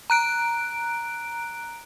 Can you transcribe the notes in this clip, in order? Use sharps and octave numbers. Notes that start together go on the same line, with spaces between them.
A#5 F#6 D7